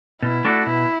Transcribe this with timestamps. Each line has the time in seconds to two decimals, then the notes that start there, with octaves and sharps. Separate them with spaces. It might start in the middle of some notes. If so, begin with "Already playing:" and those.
0.22 B2 E4
0.45 A3 D4 F#4 A4
0.66 B2 E4